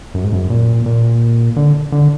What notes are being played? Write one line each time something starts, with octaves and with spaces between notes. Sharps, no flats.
F#2
G#2
F#2
A#2
A#2
D3
D3